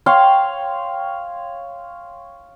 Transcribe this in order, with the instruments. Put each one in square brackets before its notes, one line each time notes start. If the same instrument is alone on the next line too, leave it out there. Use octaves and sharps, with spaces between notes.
[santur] C#5 F5 G5 C6